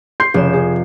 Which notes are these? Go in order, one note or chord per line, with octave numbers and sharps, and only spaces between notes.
C6 G6 C7
F1 C#3 E7
G#4